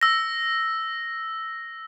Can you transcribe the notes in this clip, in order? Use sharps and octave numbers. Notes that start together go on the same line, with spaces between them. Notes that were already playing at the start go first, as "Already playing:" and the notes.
E6 A#6